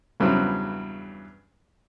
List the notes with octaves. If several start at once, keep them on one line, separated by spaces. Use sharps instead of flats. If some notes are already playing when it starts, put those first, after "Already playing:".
E2 G2 C#3 E3 F#3 C4